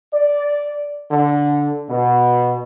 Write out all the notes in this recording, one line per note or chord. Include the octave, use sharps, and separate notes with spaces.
D5
D3
B2